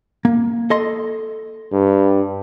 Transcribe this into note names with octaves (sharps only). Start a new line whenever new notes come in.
A#3
A4 D#5 C6
G2